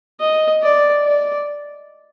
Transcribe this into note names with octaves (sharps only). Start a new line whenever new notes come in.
D#5
D5
D5